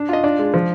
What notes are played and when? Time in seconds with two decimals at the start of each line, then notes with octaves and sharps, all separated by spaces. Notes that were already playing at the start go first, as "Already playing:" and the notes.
Already playing: D4
0.09 F4 D#5
0.24 D4 D5
0.39 G#3
0.54 F3